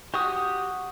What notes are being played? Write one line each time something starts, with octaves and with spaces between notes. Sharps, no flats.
F#4 G4 D#6